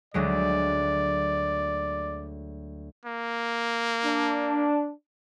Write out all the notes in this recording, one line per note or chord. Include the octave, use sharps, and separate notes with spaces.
D2 F#3 G#3 D5
A#3
D4